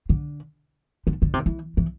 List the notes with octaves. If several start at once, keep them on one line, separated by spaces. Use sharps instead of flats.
D3
D3
D3
C3
E3
E3